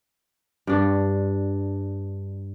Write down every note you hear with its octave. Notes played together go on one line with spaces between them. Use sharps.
G2 D4